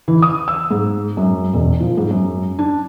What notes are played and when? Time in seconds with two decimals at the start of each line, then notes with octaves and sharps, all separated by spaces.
0.08 E3
0.22 D#6
0.48 E6
0.71 G#2
1.17 F#2
1.53 E1
1.80 F3
1.97 G#2
2.11 F#2
2.59 D4